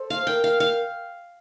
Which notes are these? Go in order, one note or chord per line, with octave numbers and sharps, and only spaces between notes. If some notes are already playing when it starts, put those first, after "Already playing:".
Already playing: A4 C5
F5
A#4 G5
F5
F5